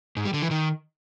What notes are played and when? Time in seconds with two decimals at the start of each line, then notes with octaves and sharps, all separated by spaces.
0.17 G#2
0.25 G3
0.34 D3
0.42 E3
0.51 D#3